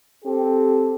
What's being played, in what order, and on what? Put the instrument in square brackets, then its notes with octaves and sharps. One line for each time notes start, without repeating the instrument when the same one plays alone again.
[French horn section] C4 G4 A4